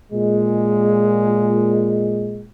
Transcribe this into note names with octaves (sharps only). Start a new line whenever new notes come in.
A#2 G#3